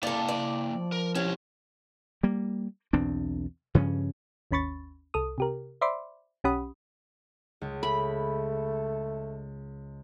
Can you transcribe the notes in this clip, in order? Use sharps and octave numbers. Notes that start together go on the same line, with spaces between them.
A#3 E4 A4 D5 F5
D5
F3
A#4
C#4 E4 G4
G3 A#3
B1 E2 C4 D4
G2 C#3 F3 C#4
G#1 D#2 C#4 B5 C#6 A6
C2 A4 D#6
C3 G4 A#4
C5 D5 E5 B5 C6 D6
B1 C#4 G4 F#5 B5 D#6
C#2
A3 B5